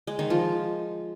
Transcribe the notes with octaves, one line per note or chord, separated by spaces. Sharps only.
G#3
D#3
F3